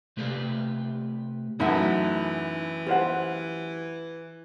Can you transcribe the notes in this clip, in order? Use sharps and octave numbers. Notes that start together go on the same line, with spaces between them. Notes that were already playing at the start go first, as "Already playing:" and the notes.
C3 A3 G4 B4 D5 F5
F#2 A2 E3 D#4 E5 F#5
F4 G4 C5 F#5